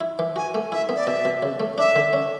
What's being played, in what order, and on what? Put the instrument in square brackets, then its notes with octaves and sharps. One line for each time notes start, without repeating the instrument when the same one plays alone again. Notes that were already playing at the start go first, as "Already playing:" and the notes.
[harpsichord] E4
E3
[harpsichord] F#4 [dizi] G#5
[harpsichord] A3
[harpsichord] E4 [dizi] E5
[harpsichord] B3
[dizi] D5
[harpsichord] B2 [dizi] E5
[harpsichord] B2
C#3
A3
[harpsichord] D4 [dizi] E5
[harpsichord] D3
C#4